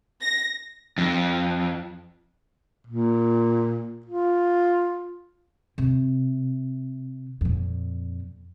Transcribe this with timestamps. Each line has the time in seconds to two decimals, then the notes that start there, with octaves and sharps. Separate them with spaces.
0.21 A#6
0.98 F2
2.87 A#2
4.06 F4
5.78 C3
7.41 F2 A#2